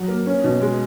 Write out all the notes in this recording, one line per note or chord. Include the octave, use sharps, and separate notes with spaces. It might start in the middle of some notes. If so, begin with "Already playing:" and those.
Already playing: F#3
A#3
C#4
B2
G#3